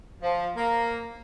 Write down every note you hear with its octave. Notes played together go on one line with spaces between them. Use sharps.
F3
A#3